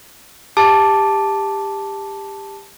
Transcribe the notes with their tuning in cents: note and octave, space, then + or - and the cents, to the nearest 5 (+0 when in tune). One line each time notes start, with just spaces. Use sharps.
G4 +20 A5 +0 D6 +0